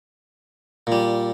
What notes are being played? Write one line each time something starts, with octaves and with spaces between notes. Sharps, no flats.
A#2 G3